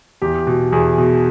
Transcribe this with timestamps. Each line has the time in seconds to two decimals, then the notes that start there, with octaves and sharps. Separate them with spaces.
0.22 E2 G4
0.47 B2
0.72 E2 G#4
0.98 B2